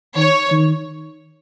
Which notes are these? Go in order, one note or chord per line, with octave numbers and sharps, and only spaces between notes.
D#3 C#5
D#3